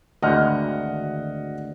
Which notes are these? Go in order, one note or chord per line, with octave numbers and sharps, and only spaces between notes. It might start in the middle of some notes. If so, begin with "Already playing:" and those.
G#1 D2 D#5 F#5 F6